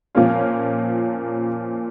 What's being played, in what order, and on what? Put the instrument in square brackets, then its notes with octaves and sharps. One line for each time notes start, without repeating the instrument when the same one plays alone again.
[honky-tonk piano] A#2 F3 A#3 C#4 F4